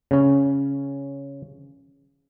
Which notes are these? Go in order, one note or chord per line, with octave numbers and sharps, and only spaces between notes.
C#3 C#4